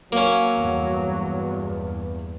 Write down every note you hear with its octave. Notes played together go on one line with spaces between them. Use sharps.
F#3 A#3 C#4
E2 G2